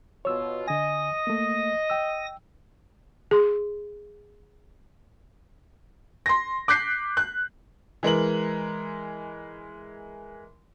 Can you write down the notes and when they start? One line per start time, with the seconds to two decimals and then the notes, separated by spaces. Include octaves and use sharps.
0.25 B2 F4 C#5 E6
0.67 D3 D#5 G#5 D#6 A#6
1.27 A3 A#3
1.90 G5 E6
3.31 G#4 C6
6.26 C6 A#6
6.68 D6 F#6 G6 B6 C7
7.17 F#6
8.03 E3 G#3 A#4 F#7